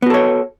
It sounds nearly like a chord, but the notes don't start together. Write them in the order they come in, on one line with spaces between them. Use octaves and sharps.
B3 F#4 A4 C#5